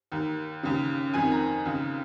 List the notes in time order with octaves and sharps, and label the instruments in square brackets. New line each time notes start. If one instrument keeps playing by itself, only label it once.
[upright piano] D#2 D#3
D#2 C#3
F2 D#3 G#5
A#5
D#2 C#3